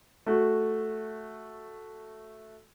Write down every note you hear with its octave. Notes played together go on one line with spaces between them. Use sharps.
A3 F#4